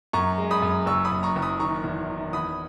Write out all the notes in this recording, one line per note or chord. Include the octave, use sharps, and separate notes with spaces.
F#2 A#5 C#6
G#3
B5 D#6
F#2
F#1 C#6 E6
B5 D#6
F#2
A#5 C#6
F#1
B5 D#6
D#3 A#5 C#6
E2
D#3
E2 B5 D#6